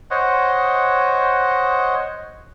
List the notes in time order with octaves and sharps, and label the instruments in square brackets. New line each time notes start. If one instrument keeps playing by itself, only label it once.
[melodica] C5 C#5 D#5 F#5